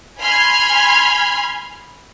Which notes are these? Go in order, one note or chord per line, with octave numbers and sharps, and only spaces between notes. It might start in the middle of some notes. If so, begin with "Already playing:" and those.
G#5 B5 C6 F6 G#6